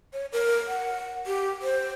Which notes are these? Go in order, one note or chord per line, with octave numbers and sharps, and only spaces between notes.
C#5
A#4
F#5
G4
C5